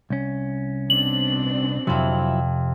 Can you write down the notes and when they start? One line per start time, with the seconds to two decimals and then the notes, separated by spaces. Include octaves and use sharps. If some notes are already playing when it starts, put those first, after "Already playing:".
0.10 C2 C#4
0.90 B2 C4 D4 F#7
1.87 F2 C3 F#3 E4